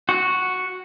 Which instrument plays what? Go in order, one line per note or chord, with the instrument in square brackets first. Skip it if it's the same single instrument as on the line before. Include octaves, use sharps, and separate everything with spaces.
[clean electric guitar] F#4